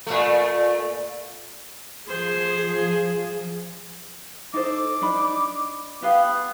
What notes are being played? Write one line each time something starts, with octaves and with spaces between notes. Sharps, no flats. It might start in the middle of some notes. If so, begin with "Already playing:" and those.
A#2 A3
F3 G#4 C5
D#4 A4 C5 D6
D4 D#4 B5
B3 G4 B4 F5